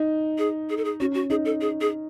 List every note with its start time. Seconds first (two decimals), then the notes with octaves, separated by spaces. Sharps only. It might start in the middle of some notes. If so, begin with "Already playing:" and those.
Already playing: D#4
0.38 G#4
0.70 G#4
0.77 A4
0.85 G#4
1.00 C#4 F#4
1.14 F#4
1.30 D#4 G#4
1.45 A4
1.61 G#4
1.81 G#4